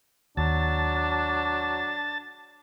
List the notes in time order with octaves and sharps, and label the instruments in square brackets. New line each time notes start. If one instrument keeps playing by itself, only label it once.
[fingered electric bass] D#2 [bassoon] F#3 [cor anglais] D4 [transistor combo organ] A5